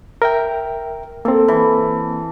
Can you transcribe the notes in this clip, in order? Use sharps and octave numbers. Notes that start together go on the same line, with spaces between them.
A#4 E5 G5
A#3 C4 A4
E3